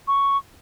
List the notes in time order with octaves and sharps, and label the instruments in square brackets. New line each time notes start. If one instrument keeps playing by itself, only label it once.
[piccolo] C#6